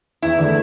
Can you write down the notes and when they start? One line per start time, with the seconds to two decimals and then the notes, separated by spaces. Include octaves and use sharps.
0.22 E2 E4
0.39 D3 A3